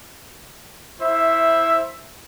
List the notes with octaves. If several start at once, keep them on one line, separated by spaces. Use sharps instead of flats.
E4 C5 E5